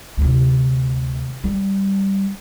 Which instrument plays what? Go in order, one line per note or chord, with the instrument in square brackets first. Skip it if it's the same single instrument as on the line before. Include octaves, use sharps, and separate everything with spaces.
[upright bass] D2 C3
G3